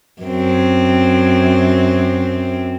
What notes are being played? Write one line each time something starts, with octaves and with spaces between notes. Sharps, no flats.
F#2 C4